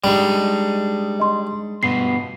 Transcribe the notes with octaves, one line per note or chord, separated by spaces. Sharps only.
G3 G#3 D4 D#4
D#5 C6
G2 B2 B3 C7